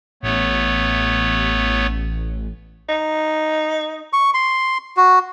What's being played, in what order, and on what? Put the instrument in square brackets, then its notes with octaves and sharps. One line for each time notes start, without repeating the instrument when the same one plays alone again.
[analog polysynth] A1 [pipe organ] A3 B3 C#5
[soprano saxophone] D#4
[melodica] C#6
C6
F#4